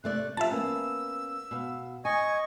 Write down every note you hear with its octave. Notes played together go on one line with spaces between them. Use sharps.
C3 A3 D5 F#6
F3 F4 G4 E5 A5 A#5
A#3 B3 C#4 E6
B2 F5
D#5 G#5 C#6 G#6